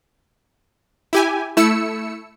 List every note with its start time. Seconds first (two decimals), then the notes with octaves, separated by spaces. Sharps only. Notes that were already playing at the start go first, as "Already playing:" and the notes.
1.13 E4 G4 G#5
1.57 A3 E4 E6 C#7